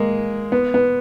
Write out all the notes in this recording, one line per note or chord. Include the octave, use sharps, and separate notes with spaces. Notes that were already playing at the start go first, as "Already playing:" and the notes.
Already playing: G#3 A#3
B3
B3